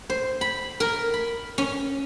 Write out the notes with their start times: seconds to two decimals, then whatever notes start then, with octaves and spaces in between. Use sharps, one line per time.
0.10 C5
0.41 B5
0.80 A#4
1.14 B5
1.58 C#4